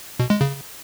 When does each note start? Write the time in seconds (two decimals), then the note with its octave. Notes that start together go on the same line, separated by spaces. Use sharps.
0.20 B2
0.30 G#3
0.41 C#3